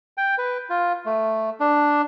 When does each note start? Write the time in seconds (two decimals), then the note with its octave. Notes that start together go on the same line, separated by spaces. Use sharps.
0.18 G5
0.38 B4
0.70 F4
1.06 A3
1.60 D4